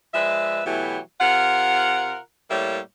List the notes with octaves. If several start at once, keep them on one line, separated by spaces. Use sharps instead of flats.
F3 G#3 B4 D5 E5
B2 E3 F#3 A3 E4 G4
C3 F4 A#4 F#5
A2 G3 A#3 C#5 E5